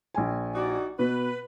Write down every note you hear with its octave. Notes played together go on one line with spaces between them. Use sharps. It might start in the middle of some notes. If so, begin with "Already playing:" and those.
A#1 G#5
D#4 F#4 D5
B2 B4